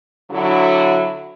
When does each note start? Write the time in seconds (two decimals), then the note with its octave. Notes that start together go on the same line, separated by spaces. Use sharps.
0.31 D3 F#3 E4